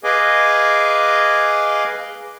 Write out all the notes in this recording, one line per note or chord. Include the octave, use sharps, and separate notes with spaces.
G#4 B4 D#5 F5 G#5 D6